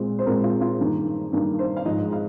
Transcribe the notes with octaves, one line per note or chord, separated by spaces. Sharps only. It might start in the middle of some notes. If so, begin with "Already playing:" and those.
Already playing: A#2 G#3 C4
C5
A#2 G#3 C4 A#4
F4
F4
G2 D#3 A#3
G2 D#3 A#3
C5
F5
G#2 F3 G#3 D#5
F5